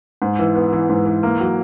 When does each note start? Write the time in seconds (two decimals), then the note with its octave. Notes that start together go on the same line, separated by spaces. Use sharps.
0.22 G#2
0.39 E3
0.55 B3
0.72 E3
0.89 G#2
1.06 E3
1.23 A#3
1.40 F#3